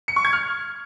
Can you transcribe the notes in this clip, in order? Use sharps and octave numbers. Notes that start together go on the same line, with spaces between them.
C#7
C#6
G#6
F6